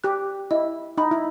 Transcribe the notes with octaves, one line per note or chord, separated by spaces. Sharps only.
G4 F#6
E4 D#5
D#4 B5
E4